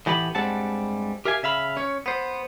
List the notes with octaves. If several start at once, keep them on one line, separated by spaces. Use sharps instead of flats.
A2 E3 B3 G4 B5
G2 G3 G#3 C4 F#5 A5
G4 A#4 E5 F5 G#5
C#3 E5 F5 B5
C#4 C#5
B3 C5